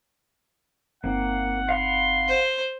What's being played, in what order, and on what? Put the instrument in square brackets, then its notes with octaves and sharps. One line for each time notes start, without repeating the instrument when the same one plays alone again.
[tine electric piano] G1 C4 D#4 [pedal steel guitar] A#3 [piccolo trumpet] F#5
[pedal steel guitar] F5 F#5 B5 [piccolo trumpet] C6
[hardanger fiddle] C5